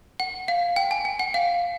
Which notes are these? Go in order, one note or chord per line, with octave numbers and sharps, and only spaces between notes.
F#5
F5
G5
G#5
G5
F#5
F5